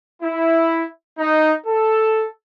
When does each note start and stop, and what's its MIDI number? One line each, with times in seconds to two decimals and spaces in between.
0.23 0.84 64
1.19 1.52 63
1.66 2.25 69